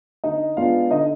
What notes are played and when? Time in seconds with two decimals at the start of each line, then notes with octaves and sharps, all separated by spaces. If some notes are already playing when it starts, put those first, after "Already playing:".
0.24 D3 D#4 D#5
0.57 G#3 B3 D4 F4 F5
0.90 D3 D#4 D#5